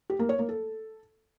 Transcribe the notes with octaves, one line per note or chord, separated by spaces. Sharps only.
G4
A#3
C#5
A#3
A4